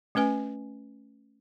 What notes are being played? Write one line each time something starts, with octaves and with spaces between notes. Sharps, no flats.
A3 C#4 B4 G#5